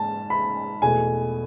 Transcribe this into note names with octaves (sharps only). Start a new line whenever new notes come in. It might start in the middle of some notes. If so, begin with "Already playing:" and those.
Already playing: G#2 A5
B5
E2 B2 A3 G#5